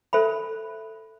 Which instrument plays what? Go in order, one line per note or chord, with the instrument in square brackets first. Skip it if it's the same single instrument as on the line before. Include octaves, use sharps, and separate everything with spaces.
[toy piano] A4 C5 E5 B5